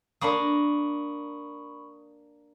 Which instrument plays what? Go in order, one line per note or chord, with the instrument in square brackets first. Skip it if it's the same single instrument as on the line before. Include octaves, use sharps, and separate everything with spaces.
[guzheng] A#3 D4 A#5 [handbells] B5 C#6 D#6